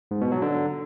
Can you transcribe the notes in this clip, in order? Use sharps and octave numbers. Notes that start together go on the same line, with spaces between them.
G#2
B2
F#3
D3